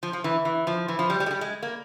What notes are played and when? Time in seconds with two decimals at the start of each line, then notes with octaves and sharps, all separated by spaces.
0.03 F3
0.13 F3
0.24 E3
0.45 E3
0.67 F3
0.88 E3
0.99 F3
1.10 G3
1.20 G3
1.26 G#3
1.31 G3
1.41 G#3
1.63 A#3